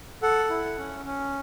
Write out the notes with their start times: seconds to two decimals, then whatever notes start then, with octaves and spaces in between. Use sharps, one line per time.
0.23 A4 F#5
0.50 E4
0.78 C#4
1.05 C#4